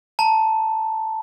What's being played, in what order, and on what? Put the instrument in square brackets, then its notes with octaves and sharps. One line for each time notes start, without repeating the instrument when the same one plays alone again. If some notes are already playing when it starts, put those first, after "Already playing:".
[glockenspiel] A5 A#5